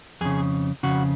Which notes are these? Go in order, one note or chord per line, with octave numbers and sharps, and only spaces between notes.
F2 C#3 G#4
F2 C#3 F#4